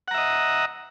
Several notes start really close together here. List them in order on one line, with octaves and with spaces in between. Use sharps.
F#5 A#5 E5 D#5